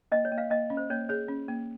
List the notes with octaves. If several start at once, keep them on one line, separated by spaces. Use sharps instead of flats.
A#3 D#5
C#5
A#3
F5
A#3 D#5
C#4
C5
A#3 C#5
G#4 C#5
C#4
A#3